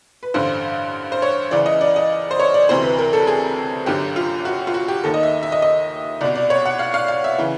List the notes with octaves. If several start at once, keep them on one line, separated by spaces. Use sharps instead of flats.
B4
A1 G2 D3 C5
C5
C#5
C#2 C#3 E3 D5
D#5
D5
D#5
C5
C#5
D5
D2 C3 E3 C5
B4
A#4
A4
G#4
G1 F#2 D3 G4
F4
F#4
F4
F#4
G4
D#2 D#3 A4
D#5
E5
E5
D#5
D#5
C2 B2 D5
D5
C#5
F#5
F5
F5
F5
E5
C#3 E3